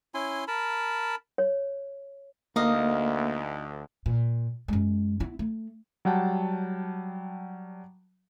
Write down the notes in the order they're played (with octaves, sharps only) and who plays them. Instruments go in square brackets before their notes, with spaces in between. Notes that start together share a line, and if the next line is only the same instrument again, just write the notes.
[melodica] C#4 E4 G#5 C6
A#4 A5 B5
[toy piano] C#5
[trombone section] D2 [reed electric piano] A#3 [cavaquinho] D#4 D#5 F5
[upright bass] A#2
F#2 G#3
B3 E4
A3
[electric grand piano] F#3 G3 F#5 G5 A5